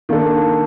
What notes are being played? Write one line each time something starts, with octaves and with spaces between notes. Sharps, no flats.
D#3 A#3 D4 A4